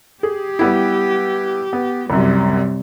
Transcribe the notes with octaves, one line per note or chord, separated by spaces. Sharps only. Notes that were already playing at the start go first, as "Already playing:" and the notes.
G4 G#4
G3 B3 E4
B3
C2 F#2 C3 G3